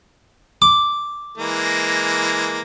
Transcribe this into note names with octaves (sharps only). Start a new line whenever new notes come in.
D6
E3 G#3 A#3